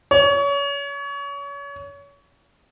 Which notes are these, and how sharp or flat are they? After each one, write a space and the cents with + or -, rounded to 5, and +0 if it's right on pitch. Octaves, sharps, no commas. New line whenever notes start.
C#5 +30